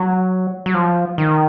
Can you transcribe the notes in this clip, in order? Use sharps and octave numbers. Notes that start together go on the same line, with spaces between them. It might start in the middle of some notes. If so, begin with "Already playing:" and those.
Already playing: F#3
F#3
F3
D#3